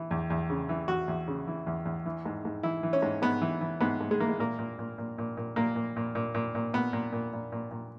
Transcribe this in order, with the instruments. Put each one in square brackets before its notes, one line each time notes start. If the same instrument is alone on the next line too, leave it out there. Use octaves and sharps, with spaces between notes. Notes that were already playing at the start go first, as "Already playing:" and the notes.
Already playing: [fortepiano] E3
E2
E2
C#3
E3
E2 F#4
E2
C#3
E3
E2
E2
E3
G#2
G#2
E3 E4
E3
C#4
G#2
G#2 B3
E3
E3
G#2 B3
G#2
G#3
E3 A#3
G#3
A#2 A#3
A#2
A#2
A#2
A#2
A#2
A#2 A#3
A#2
A#2
A#2
A#2
A#2
A#2 B3
A#2
A#2
A#2
A#2
A#2